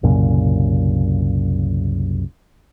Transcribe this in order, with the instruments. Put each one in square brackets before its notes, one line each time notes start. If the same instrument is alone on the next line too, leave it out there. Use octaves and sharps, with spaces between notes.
[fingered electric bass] C2 F#2 A#2 C#3